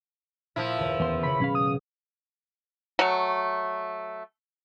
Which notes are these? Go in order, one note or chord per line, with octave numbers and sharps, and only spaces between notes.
A#2 F3 E4
F#1 D#2 B4
E2 B3 C5
C#3 B5 C#6 C#7
B1 C#4 G#4 F5
F#3 D#6
F#3 A3